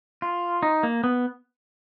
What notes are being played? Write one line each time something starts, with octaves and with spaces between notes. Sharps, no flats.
F4
D#4
A#3
B3